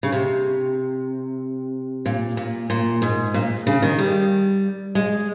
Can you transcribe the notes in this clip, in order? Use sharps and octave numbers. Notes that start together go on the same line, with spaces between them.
C#3
C3
A#2
A#2
A#2
G#2
A#2
C#3
D#3
G3
G#3